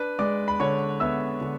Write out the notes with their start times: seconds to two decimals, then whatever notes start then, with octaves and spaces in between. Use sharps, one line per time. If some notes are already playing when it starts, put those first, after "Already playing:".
Already playing: D4 B4
0.19 G#3 D5 D6
0.48 B5
0.60 D3 C#5 C#6
1.00 B3 E5 E6
1.41 D3